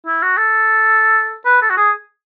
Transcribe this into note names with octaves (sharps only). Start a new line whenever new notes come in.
E4
F#4
A4
B4
A4
F#4
G#4